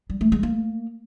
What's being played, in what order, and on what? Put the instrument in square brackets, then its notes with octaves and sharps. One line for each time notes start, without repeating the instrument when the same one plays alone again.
[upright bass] G3
A3
G#3
A#3